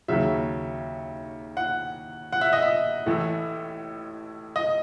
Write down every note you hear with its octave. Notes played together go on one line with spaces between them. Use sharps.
D#2 C#3 F#3 E5
F#5
F#5
E5
D#5
E5
A1 A2 E3 A3
D#5